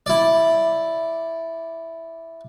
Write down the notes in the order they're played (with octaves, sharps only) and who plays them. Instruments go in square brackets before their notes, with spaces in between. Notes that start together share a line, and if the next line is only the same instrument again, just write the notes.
[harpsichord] E4 D5